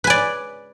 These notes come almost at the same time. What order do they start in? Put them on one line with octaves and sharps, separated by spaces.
B4 G#5 D5